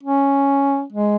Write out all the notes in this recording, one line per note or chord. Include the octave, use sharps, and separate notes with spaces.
C#4
G#3